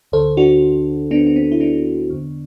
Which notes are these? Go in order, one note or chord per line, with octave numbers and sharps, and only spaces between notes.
D2 D3 A4 C5
D4 F#4
B3 D4
D4
C4
E4
B3 D4
E2 D3